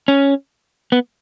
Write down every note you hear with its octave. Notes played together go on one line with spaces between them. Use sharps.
C#4
B3